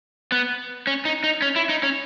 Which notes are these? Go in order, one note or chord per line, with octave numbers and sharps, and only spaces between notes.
B3
C#4
D#4
D#4
C#4
E4
D#4
C#4